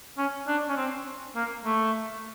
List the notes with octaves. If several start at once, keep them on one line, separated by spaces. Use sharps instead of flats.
C#4
D4
C#4
C4
A#3
A3